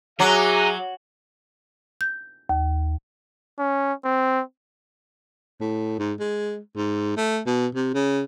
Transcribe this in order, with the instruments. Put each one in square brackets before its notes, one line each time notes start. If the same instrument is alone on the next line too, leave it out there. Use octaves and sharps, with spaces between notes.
[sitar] F#3 [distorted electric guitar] D#4 [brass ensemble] F#4 G#4 E5 [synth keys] A#5 D6 F#6
[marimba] G6
D#2
[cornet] C#4
C4
[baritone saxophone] A2
G#2
G#3
G#2
A3
B2
C3
C#3